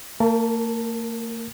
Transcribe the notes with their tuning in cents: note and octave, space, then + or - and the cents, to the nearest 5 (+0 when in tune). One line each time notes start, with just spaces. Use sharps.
A#3 -45 A#4 +0 A5 +0